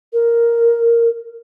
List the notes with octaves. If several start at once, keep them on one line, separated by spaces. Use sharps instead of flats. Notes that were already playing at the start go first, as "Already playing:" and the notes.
A#4